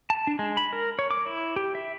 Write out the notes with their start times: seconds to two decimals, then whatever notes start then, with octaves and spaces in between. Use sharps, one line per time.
0.10 A5
0.27 D4
0.39 G#3
0.57 B5
0.73 A#4
0.99 C#5
1.11 D6
1.26 E4
1.56 G4
1.75 E5